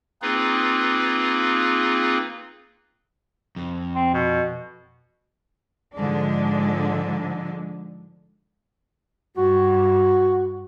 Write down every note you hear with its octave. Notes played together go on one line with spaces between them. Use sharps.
A#3 C4 D#4 F4 G#4 B4
F2
C4
B2
G#2 D3 F3 G#3 D4
G2 F#4